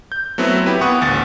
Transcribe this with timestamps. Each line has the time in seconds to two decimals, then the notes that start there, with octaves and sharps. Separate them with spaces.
0.12 G6
0.38 F#3 A3 B3 C4 E4
0.66 B3 E4 G4 B4
0.81 A#2 B3 F#5 C#6 D#6
1.01 A1 D2 A6